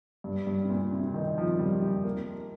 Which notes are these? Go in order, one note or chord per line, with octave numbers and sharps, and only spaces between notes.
G2
G2
C3
A#2
C3
D#3
F3
G3
G3
A#3